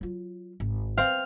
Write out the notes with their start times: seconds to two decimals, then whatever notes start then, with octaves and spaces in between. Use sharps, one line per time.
0.01 F#3 F4
0.60 G#1
0.97 C4 F5